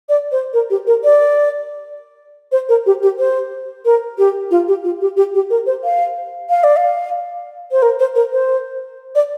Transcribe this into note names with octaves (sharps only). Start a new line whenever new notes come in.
D5
C5
A#4
G4
A#4
D5
C5
A#4
G4
G4
C5
A#4
G4
F4
G4
F4
G4
G4
G4
A#4
C5
F5
F5
D5
F5
C5
A#4
C5
A#4
C5
D5